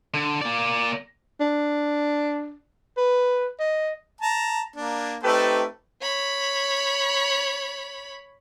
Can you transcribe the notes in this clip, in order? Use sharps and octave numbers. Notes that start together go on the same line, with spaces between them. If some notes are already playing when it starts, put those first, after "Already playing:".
D3
A#3 D5
D4
B4
D#5
A5 A#5
A#3 D4
A3 C4 D#4 G4 A4 B4
C#5 B5